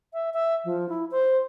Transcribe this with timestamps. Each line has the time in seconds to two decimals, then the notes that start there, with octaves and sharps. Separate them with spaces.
0.13 E5
0.33 E5
0.65 F3
0.89 E4
1.11 C5